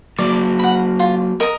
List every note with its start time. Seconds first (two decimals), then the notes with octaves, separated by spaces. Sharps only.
0.18 F#3 A#3 D5
0.59 F#5 B5
0.99 F4
1.40 A#4 D#5 A#5